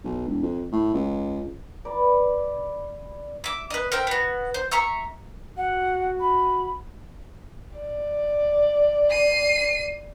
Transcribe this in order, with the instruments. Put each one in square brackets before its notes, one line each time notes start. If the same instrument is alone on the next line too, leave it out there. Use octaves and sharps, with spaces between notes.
[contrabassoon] B1
E1
F2
A2
C#2
[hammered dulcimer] B4 D5
[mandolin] E5 D6
B4 D#5
A#4 C5 E5 G5
B3 F#4
C5
E5 A#5 C#6 E6
[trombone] F#4 [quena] F#5
[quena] B5
[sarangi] D5
[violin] C7 D#7